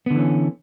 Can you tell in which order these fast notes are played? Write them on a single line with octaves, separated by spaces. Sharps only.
B3 D3 E3 C#4